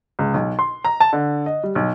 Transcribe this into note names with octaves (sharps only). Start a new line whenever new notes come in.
C#2
B1
C6
A#5
A5
D3
D#5
G3
B1